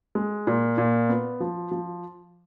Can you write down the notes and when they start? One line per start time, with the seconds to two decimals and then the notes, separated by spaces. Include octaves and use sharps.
0.15 G#3
0.47 A#2
0.78 A#2
1.09 B3
1.40 F3
1.71 F3